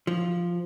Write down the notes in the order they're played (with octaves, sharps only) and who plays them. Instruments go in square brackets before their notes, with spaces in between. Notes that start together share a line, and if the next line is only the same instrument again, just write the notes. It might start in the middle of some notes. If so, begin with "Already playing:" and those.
[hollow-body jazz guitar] F3